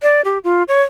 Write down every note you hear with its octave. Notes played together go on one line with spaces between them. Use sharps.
D5
G4
F4
C#5